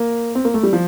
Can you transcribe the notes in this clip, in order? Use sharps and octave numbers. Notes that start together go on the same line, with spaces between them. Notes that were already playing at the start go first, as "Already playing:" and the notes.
Already playing: A#3
C4
A#3
A3
G3
F3